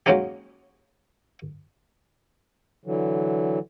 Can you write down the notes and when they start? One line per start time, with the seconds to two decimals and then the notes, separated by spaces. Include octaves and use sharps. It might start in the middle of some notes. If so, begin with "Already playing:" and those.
0.06 F#3 G#3 A#3 C#4 D#4 G4
2.86 D3 E3 F#3